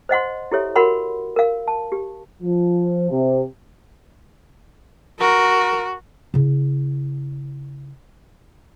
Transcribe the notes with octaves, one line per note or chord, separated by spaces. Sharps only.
C5 D#5 F#5 C6
E4 G4 A4 C#5 E5
F#4 A#4 F#5 B5 C6
A#4 F5
A5
G4
F3
C3
F#4 A#4
C#3 E4